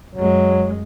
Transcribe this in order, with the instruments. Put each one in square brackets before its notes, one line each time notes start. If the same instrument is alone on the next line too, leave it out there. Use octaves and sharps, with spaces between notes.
[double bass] F#2 G#3 [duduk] F#3